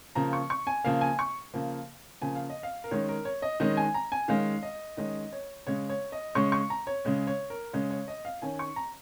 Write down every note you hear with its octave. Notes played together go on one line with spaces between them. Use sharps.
C#3 F3 A#3 A#5
C#6
C#6
G#5
C#3 F3 A#3 F5
G#5
C#6
C#3 F3 A#3
C#3 F3 A#3 G#5
F5
D#5
F5
A#4
D#3 G#3 C#4 C#5
A#4
C#5
D#5
D#3 G#3 C#4 D#5
G#5
A#5
G#5
D#3 G#3 C#4 F5
D#5
D#3 G#3 C#4 D#5
C#5
C#3 G#3 C#4 C#5
C#5
D#5
C#3 G#3 C#4 C#6
C#6
A#5
C#5
C#3 G#3 C#4
C#5
A#4
C#3 G#3 C#4 C#5
C#5
D#5
F5
D#3 C#4 G#5
C#6
A#5